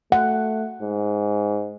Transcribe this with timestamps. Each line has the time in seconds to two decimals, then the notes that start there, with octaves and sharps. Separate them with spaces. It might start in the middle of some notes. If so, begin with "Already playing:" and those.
0.12 A3 F#5
0.82 G#2